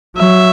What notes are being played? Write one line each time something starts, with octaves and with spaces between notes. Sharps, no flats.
F#3 E5